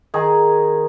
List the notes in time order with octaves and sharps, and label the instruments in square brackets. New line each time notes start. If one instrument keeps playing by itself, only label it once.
[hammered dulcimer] D#3 G#4